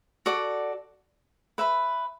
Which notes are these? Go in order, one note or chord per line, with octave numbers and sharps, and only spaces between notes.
F#4 A4 D5
B4 E5 B5